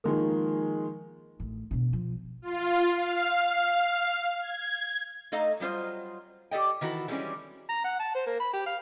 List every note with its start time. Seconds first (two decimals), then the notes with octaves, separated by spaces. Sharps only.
0.04 D#3 F3 G#3 A#3
1.40 A1
1.71 B2 D3
1.93 F3
2.42 F4
2.94 F5
4.40 G#6
5.32 A3 D#4 A4 D#5 F5
5.60 F#3 G3 F4 C5 D#5
6.51 G4 A4 D5 D#5 G5
6.81 D#3 E3 E4 F#4 A4
7.08 E3 G3 G#3 B3 C#4 D4
7.69 A#5
7.84 F#5
8.00 A5
8.15 C5
8.27 A#3
8.40 B5
8.53 G4
8.67 F5